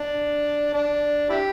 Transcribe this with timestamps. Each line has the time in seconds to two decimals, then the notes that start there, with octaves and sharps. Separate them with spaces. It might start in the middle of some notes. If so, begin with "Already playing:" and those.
Already playing: D4
0.73 D4
1.30 E4 G4